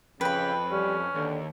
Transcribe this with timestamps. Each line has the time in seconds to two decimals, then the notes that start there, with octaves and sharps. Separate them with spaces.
0.21 F2 C#3 B4 G5 B5
0.71 G3 C#4
1.15 D#2 D3